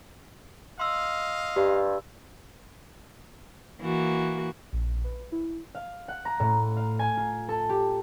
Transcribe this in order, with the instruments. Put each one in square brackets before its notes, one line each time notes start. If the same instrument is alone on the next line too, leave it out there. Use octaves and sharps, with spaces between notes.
[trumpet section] D#5 F5 [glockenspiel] C6 E6
[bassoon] G2 [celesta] G4
[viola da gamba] E3 A#3 F#4
[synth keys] A#1
B4
E4
[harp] F5
F#5
A#5
A2
F5
G#5
F4
A4
G4